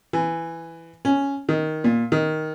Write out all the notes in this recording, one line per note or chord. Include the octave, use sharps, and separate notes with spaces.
E3
C#4
D#3
A#2
D#3